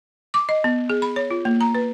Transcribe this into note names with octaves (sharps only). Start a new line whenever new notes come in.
D6
D#5
B3
G#4
B5
C#5
F4
A#3
A#5
B4